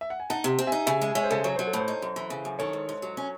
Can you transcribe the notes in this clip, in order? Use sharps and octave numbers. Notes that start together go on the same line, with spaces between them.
E5
F#5
G#5
D#4 F#5 A5
C3
C4
E5 G#5
D#4
C#3 E5 G#5
G#3
G#3 C#5 E5
C5
C#3 A4
F#3 C#5
F#3 C5
A4
A2
C5
D#4
F#2
E3
C#3
F#2
D#3 A4 C#5
G#2
G#2
F#3
C#4